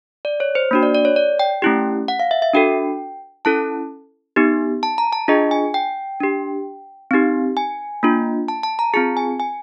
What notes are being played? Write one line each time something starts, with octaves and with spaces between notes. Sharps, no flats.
D5
C#5
C5
A#3 D4 F#4
D5
D5
C#5
D5
G5
A3 C#4 E4 G4
F#5
F5
E5
E5
D4 F#4 A4 G5
C#4 E4 A4 A5
B3 D#4 G4
A5
A#5
A5
D4 F4 G#4 D#5
G#5
G5
D4 G4
C4 D#4 G4
G#5
A#3 D4 F4
A5
A5
A#5
C4 F4 G#4 A5
G#5
G#5